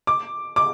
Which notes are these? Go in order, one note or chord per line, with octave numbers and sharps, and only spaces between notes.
D6
D6